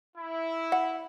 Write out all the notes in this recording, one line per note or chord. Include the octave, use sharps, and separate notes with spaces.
E4
F#5